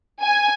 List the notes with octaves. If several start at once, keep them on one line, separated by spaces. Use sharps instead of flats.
G#5